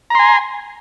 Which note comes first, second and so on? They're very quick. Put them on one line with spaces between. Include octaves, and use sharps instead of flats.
A#5 C6 G#5